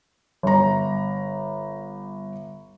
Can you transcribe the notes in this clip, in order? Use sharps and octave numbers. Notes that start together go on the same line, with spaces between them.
G1 A#5